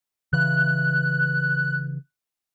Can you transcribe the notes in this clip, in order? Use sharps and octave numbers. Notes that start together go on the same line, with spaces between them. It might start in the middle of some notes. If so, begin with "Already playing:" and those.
C#3 E3 F#6